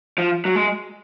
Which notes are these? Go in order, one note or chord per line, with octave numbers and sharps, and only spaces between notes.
F3
F#3
G#3